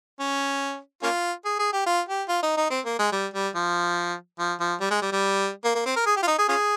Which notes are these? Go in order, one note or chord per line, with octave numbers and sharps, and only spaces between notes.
C#4
A#3 C#4 F4
G#4
G#4
G4
F4
G4
F4
D#4
D#4
C4
A#3
G#3
G3
G3
F3
F3
F3
G3
G#3
G3
G3
A#3
A#3
C4
A#4
G#4
G4
F4
D#4
G#4
C#4 F4 G#4